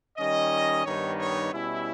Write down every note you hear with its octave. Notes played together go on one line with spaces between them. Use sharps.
D#3 G3 C#4 D#5
G2 D#3 G3 B3 D#4 C#5
C#5
B2 G3 C#4 E4